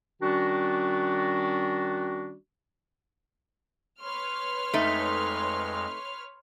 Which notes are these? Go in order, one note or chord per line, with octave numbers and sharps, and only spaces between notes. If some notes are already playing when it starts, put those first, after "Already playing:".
D#3 G3 C#4 D4 F#4
B4 C#5 C6 F6
F2 G#3 A3 D#4